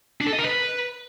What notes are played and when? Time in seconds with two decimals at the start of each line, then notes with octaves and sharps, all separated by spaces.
0.21 D4
0.27 A4
0.33 D#5
0.39 A#4
0.45 B4